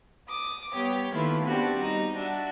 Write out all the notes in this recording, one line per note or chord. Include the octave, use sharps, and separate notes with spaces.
D6 D#6
G3 B3 G4 C#5
D#3 A3 A#3 E4 F4 B4
B3 C4 D4 F#4 G4
G3 D#4
D4 F#4 E5